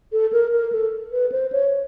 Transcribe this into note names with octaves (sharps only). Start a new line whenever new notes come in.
A4
A#4
A#4
A4
B4
C5
C#5